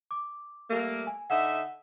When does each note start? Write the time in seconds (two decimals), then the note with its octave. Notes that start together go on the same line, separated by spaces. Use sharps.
0.11 D6
0.70 G3 A3 A#3
1.07 G#5
1.30 D3 D#4 E5 F#5